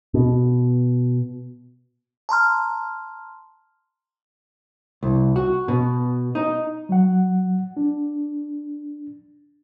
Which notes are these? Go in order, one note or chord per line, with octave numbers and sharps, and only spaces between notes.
B2
A5 A#5 C6 F6
C2
F#4
B2
D#4
F#3 F#5
D4